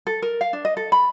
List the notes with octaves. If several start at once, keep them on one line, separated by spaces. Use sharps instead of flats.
A4
A#4
F5
D4
D#5
A4
B5